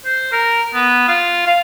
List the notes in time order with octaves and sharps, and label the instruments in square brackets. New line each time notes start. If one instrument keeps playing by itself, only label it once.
[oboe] C5
A#4
B3
F4
F5